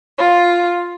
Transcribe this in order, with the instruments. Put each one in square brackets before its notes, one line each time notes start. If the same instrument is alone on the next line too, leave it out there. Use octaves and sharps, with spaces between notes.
[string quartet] F4